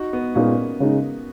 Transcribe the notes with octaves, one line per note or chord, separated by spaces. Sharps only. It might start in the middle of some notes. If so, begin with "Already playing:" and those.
Already playing: D#4 F#4
B3
A#2 G#3 A#3 B3 C#4 D#4
C#3 G#3 D#4